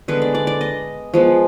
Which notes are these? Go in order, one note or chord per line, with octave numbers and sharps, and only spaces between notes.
D3 G#3 B3 B4
D5
D5
D5
D#5
F3 G#3 B3